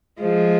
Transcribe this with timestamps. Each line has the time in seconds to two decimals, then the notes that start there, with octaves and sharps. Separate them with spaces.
0.21 F3 G#3